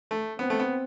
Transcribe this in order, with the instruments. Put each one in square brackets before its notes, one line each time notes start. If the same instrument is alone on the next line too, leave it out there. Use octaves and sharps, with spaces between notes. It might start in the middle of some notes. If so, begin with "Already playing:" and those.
[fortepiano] A3
[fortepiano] B3 [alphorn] C4
[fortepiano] A3
B3